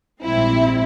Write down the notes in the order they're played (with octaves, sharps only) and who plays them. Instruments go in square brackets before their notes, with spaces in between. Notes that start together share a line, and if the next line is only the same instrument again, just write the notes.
[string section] A#1 G#2 G3 C4 E4